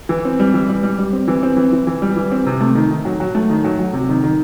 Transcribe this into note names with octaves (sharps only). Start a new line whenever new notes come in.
E3
C4
G3
E3
G3
G3
G3
C4
E3
C4
E3
E3
E3
G3
E3
C4
C3
A3
D#3
D#3
F#3
F#3
A3
D#3
F#3
F#3
C3
D#3
D#3